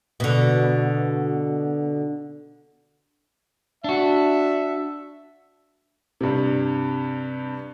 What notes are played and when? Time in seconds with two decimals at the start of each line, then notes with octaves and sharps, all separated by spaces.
0.20 B2 D3
3.84 D4 F#4 E5
6.21 G2 C3